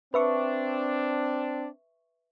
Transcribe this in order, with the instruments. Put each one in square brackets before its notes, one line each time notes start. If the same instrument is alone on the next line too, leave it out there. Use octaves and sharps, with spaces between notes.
[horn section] C4 D4 [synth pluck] B4 E5 C#6